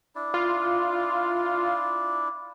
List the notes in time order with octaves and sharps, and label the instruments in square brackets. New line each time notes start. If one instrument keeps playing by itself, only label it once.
[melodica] D4 E4 D5
[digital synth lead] F4